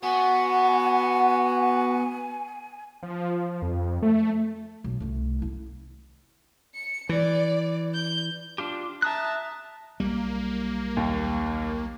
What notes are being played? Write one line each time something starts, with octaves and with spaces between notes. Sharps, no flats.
B3 F#4 F#5 G#5
F3
F2
A3
B1
C2 A3
E4
C#7
E3 D5
G6
D4 F4 G4
E5 A5 A#5 D#6 F#6
B1 G3 A#3
D#2